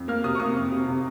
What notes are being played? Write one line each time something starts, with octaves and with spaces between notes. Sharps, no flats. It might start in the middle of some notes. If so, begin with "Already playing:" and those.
Already playing: F2
A#3 F6
C3 D#6
C#6
A#3 D#6
F2
C3
C3